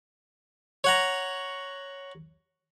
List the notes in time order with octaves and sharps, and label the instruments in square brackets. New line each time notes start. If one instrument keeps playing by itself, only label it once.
[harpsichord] C#5 F#5 A#5